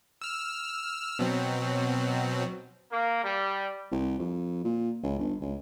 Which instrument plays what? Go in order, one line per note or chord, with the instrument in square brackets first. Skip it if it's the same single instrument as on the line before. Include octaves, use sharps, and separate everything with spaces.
[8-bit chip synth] E6 F6
B2 F#3 C4
[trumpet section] A#3
G3
[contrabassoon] C2
F2
A#2
C#2
G1
C#2